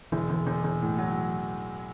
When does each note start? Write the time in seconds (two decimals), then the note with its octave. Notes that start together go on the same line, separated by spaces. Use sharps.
0.12 E1 E3
0.30 E1
0.47 E1
0.64 E1
0.82 A2
0.98 F#3